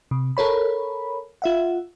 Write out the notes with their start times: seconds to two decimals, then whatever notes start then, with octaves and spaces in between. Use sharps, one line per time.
0.11 C3
0.37 A4 A#4 C#5 B5
1.42 F4 E5 F#5